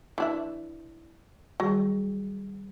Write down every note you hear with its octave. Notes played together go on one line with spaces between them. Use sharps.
E3 D4 E5
D#3 F#3 G3 G#4